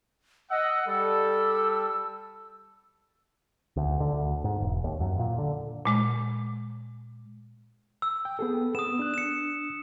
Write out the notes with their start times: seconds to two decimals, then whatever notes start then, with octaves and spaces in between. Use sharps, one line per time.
0.51 D#5 F#5 E6
0.88 G3 A4 E6
3.76 D2
4.00 D3
4.13 D2
4.44 G#2
4.60 E1
4.84 D#2
5.00 F#2
5.19 A#2
5.38 D3
5.85 A#2 G#3 D6
8.02 E6
8.25 G5
8.39 B3 G#4 A4
8.75 B3 D#6 E7
8.99 D4 F#6
9.14 C#7 E7